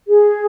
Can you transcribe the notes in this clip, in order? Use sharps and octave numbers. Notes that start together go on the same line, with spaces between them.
G#4